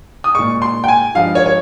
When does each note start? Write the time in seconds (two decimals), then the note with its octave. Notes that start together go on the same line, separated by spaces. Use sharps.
0.24 D#6
0.35 A#2 G#3 C#6
0.62 C6
0.84 G5
0.88 G#5
1.15 G2 F3 G#3 F5
1.35 C#5
1.46 C#5